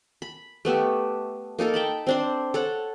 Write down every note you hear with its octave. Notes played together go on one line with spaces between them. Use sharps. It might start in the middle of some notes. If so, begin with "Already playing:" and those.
B5
A3 B3 G4 E5
A#3 D#4 A4 A#4
G5 A5 B5
C4 D4 C5
A4 C#5 F#5